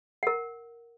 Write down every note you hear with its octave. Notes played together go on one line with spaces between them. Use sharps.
A#4 F#5